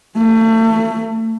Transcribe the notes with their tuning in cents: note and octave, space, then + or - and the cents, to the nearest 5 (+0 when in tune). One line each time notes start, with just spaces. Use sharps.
A3 +30